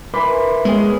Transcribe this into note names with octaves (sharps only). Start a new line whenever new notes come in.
E3 A#4 B4 B5 C6 D6
G#3 B3 C#4 G#4